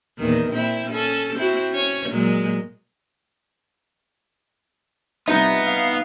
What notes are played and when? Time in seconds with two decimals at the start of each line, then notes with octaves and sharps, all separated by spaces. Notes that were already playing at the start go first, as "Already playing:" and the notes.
0.19 E2 A#2 D#3
0.51 A#2 C4 E4
0.91 C#4 A4
1.36 C4 E4 F#4
1.72 C#4 C#5
2.09 A#2 F#3 G#3
5.27 C2 B3 D#4 F4 E5
5.65 F5